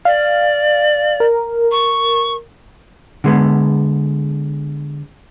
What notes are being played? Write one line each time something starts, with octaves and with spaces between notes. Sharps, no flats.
D5 F5
A#4
C#6
D3 G#3 B3